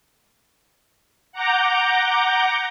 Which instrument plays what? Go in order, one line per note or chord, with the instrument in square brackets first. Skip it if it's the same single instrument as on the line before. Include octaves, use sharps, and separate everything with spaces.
[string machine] F#5 A#5 D6 G6